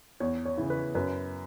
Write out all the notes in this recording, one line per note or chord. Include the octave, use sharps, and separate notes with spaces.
E2 C#5
C#5
C#3 E3
B4
F#2 B4